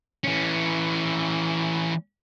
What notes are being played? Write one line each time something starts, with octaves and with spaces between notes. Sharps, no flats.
E3 C#4